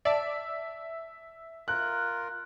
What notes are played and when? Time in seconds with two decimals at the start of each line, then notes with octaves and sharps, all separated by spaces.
0.05 D5 E5 A5
1.68 F4 A#4 F#6